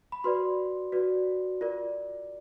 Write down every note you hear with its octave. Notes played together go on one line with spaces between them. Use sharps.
B5
F#4 B4 D5 C6
F#4 B4 D5
F4 A#4 D5